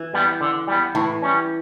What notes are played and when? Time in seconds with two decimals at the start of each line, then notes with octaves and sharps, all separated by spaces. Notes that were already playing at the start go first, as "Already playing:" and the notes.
Already playing: E3
0.14 G3 B3
0.41 D3
0.68 G3 B3
0.95 A2 E3
1.22 G3 C#4